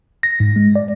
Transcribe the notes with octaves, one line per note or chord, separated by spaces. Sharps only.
A#6
G#2
G#3
D5